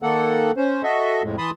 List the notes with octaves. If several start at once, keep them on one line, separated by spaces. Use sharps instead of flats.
D#3 A#3 A4 F#5
C#4 C5
F#4 A4 D#5 E5
F2 A2 G#3
E3 A5 B5 C6 D#6